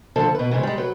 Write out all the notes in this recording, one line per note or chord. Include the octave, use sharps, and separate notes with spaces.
D2 D3 F3 A4 A5
B2 B4
G#2 C#3 E3
G3 G#3
F#3 B4